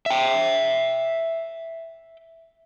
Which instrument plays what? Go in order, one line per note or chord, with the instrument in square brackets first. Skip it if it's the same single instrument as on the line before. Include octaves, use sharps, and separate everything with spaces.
[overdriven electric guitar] E5 G5